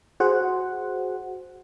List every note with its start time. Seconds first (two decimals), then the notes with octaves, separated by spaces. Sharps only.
0.20 F#4 G#4 C5 F#5